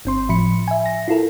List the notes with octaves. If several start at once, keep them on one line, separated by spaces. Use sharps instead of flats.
G1 C4 C6
A2 F3 B5 C#7
E5 G#5
A#6
E4 F4 A4 A#4